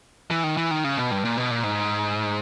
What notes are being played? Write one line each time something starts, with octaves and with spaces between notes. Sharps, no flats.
E3
D#3
E3
D#3
C#3
B2
G2
A#2
B2
A#2
G#2